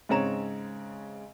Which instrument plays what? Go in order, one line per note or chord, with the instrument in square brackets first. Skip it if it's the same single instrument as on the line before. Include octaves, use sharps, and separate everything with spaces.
[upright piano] G#2 C#3 C4 C#5 A#5 E7